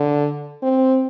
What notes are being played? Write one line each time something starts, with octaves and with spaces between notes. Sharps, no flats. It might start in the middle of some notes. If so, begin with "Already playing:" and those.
Already playing: D3
C4